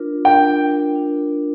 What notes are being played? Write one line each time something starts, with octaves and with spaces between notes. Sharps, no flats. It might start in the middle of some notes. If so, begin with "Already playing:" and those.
Already playing: D4 F4 A#4
D4 F4 A#4 G5
D4 F4 A#4